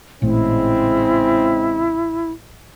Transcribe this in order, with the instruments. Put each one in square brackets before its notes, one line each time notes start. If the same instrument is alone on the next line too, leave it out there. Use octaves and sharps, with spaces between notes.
[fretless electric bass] A1 A#2 A3 [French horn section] C#3 G#3 C4 [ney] E4